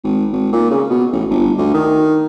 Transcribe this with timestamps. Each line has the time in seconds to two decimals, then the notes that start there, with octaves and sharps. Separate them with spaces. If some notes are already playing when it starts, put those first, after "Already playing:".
0.04 G#1
0.33 G#1
0.53 A#2
0.71 C#3
0.90 B2
1.13 A1
1.30 G1
1.58 D2
1.74 D#3